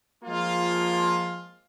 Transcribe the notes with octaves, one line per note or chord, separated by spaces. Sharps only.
F3 G#3 A#3 F4